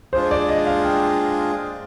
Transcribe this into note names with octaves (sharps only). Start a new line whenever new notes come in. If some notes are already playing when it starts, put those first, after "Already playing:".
G#3 D4 F4 G#4 C5
D5
D#5
F5
G5